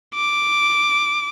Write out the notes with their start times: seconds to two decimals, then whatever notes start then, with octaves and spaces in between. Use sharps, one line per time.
0.15 D6